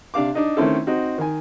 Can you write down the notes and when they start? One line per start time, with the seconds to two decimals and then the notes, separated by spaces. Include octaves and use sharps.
0.14 C3 D4 F5 D6
0.35 D4 D#4
0.57 D#3 A3 C4 C#4 E4 A4
0.87 C4 D#4 F#4
1.18 D#3 G#5